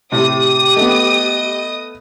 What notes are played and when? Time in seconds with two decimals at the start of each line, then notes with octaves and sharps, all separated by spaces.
0.12 A2 C3 G4 D#6
0.77 A3 B3 D#5